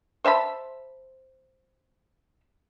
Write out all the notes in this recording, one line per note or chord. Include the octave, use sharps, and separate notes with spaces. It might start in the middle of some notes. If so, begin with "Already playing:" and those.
C5 E5 A5 B5